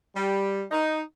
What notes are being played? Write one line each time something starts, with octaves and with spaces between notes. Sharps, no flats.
G3
D#4